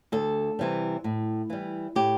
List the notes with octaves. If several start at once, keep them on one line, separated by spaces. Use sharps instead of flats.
D2 A4
C3 E3 G3
A2
E3 G3
A2 G4